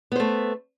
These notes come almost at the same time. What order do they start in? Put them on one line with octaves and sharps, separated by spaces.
B3 C5 A3